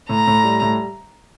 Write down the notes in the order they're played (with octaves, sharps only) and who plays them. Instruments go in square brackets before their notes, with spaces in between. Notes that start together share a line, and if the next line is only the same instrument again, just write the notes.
[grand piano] A2 [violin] A#5
[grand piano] A2
G3
A2